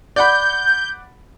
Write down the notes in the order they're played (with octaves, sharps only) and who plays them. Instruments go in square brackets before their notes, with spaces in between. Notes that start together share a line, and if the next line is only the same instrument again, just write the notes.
[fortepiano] D5 F#5 B5 [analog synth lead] G6